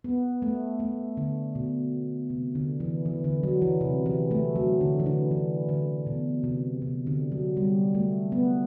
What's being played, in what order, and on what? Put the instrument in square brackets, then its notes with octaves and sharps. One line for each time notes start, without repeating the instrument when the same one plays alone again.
[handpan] B3
A3
A3
D3
B2
C3
D3
E3
E3
D3
F#3
E3
C3
E3
A3
F#3
D3
E3
D3
E3
D3
B2
C3
C3
D3
F#3
G3
A3
B3